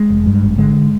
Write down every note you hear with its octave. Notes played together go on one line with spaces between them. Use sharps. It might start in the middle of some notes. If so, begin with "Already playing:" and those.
Already playing: G#3
F1
G2
G#1
D3 G#3